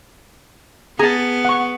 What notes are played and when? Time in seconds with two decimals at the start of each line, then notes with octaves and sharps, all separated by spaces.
0.99 B3 G#4 A5 A#5
1.45 F#5 C#6